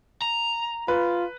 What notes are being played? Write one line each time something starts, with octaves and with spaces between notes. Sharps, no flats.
A#5
F4 B4